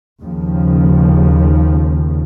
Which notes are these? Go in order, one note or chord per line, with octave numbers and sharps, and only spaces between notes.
D#2 C#3 F3